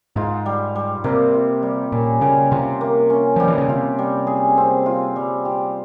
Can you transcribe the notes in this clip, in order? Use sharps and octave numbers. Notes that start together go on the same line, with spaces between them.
G#2 F4
G3
G3
C3 A#3
F4
G3
A#2 C#4
C#3 G3
C3 F4
A#3
C#4
F3 G3
E3
C#3
C3 F4
G3
G#4
C4
F4
G3
G4